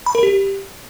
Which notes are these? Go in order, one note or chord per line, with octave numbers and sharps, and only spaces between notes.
B5
A#4
G4